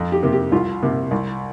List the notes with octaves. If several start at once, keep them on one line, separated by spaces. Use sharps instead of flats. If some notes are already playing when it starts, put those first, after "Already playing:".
Already playing: F2
G4
C3 A#3
G4
C2 F4
C3 A#3
C2